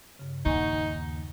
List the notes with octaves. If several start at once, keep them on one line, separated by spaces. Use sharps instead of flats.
G2 C#3
D#2 D#4 F#5 G#5 C#6